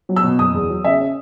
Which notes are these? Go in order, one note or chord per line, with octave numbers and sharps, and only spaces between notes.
F#3
E6
B2
F#1 D#6
E2
F#3
C#3 E5
C#4